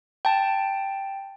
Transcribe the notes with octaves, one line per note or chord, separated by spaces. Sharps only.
G5 A5